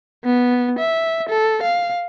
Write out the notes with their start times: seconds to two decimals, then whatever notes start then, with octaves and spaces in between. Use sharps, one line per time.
0.24 B3
0.79 E5
1.29 A4
1.62 F5